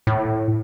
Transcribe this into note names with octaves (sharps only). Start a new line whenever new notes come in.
A2